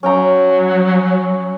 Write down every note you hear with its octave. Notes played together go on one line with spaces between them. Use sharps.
F#3 C#4 G5 A#5